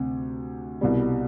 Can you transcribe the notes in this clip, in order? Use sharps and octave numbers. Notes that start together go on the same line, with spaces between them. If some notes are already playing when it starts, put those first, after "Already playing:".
Already playing: D2 C3
C2 B2 G3